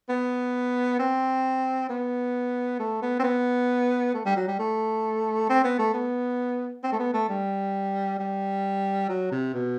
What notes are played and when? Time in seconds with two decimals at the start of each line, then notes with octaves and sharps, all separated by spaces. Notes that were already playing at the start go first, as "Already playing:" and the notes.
0.09 B3
0.99 C4
1.89 B3
2.79 A3
3.02 B3
3.20 C4
3.23 B3
4.14 A3
4.25 G3
4.36 F#3
4.48 G3
4.59 A3
5.49 C4
5.64 B3
5.79 A3
5.94 B3
6.84 C4
6.92 A3
6.99 B3
7.14 A3
7.29 G3
8.19 G3
9.09 F#3
9.31 C3
9.54 B2